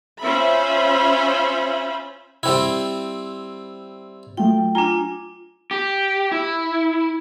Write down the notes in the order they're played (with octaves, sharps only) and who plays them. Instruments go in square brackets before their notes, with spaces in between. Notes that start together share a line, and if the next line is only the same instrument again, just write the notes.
[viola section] C#4 F4 C5 E5 B5
[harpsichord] G3 C4 E4
[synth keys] F#3 A3 F4 [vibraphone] G5
[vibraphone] D4 F4 [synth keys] G#5 A#5
[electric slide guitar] G4
E4